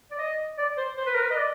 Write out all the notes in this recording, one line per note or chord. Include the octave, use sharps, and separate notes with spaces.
D5
D#5
D5
C5
C5
B4
A#4
B4
D#5
D5